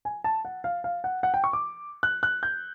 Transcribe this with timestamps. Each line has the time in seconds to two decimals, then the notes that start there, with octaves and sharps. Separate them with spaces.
0.05 G#5
0.24 A5
0.45 F#5
0.64 F5
0.84 F5
1.04 F#5
1.23 F#5
1.34 G5
1.44 C#6
1.53 D6
2.03 F#6
2.23 F#6
2.43 G6